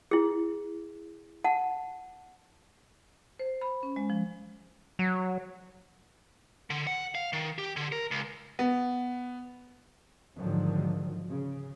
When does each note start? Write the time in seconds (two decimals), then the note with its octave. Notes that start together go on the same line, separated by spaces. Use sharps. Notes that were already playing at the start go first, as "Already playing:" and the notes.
0.11 E4 G#4
1.44 F#5 A5
3.39 C5
3.61 B5
3.83 C#4
3.96 G#3
4.10 F3
4.99 F#3
6.70 D3
6.87 F#5
7.15 F5
7.33 D#3
7.58 G4
7.76 D3
7.92 A#4
8.11 C#2
8.59 B3
10.36 G#1 G#2 D3 D#3 F3 F#3
11.29 C#3